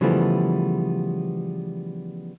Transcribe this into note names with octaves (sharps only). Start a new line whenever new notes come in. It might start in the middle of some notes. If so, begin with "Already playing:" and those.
C#3 E3 F3 G3 A3 B3